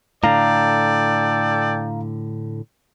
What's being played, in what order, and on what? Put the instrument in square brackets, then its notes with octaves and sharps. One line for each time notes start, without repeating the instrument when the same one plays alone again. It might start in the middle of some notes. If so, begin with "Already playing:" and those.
[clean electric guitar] A2 D3 [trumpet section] A4 D5 G5 [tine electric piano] F5 A#5